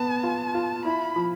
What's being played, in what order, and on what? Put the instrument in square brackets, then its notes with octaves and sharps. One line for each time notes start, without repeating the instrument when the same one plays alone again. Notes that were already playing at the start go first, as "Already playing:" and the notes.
Already playing: [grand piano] B3 [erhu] A5
[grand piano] F4
F4
[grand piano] E4 [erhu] B5
[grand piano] F3